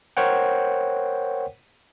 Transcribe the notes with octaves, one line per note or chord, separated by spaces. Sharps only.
A#4 C5 C#5 F#5 G5